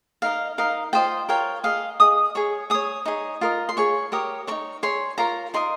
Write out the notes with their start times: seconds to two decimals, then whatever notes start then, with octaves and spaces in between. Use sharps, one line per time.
0.22 D#4 A#4 D#5 F5
0.58 D#4 A#4 D#5 F5
0.93 F4 C5 D#5 G5
1.29 F4 A#4 C#5 G5
1.64 G#4 D#5 F5
2.00 G#4 D#5 D#6
2.35 G#4 C#5 C#6
2.70 G#4 C#5 D#6
3.06 D#4 G#4 C#5
3.41 F4 A#4 D#5
3.69 C6
3.77 G#4 C#5 C#6
4.12 G4 A#4 C#5 D#6
4.47 D#4 A#4 C#5 C#6
4.83 G#4 C#5 C6
5.18 F4 A#4 C#5 A#5
5.54 D#4 A#4 D#5 C6